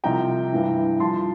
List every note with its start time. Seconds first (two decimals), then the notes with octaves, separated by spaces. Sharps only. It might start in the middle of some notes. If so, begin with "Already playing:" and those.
0.04 C2 C3 F3 G5 A#5
0.52 G2 E3
1.00 G2 F3 A5 C6